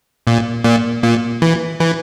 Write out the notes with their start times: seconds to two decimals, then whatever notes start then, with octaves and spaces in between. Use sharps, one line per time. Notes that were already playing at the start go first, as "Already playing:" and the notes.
0.27 A#2
0.64 A#2
1.03 A#2
1.42 E3
1.80 E3